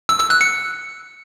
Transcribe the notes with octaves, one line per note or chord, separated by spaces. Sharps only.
E6
E6
F#6
C#7